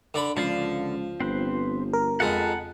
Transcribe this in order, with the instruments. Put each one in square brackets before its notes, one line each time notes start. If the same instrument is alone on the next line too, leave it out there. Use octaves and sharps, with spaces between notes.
[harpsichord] D3 D5 B5
[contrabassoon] C#2 [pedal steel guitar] D3 D5 F5 [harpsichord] F3
[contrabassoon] G1 [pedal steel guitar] C4 B4 C5
[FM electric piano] A#4
[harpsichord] F2 G#3 [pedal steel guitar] F#5 A5 B5